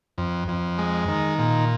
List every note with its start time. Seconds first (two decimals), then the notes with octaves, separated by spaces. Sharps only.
0.18 F2
0.48 F2
0.78 G#3
1.08 D#3
1.38 A#2